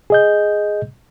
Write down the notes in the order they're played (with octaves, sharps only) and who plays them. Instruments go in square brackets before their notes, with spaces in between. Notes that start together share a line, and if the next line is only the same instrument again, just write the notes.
[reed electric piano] G#4 D#5 G6